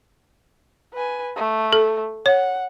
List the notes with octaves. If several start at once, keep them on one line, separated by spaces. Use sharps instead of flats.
B4 G#5
A3
A4
C#5 F#5